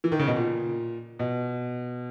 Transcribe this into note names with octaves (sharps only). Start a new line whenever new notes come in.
E3
D#3
C#3
B2
A#2
B2